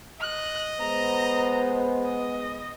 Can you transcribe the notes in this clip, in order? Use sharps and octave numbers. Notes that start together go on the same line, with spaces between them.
D#5 F#6
G#3 B3 C5 A#5
D#5